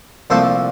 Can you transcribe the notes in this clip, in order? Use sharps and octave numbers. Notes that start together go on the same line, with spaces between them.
C2 A#2 F3 A3 A4 C5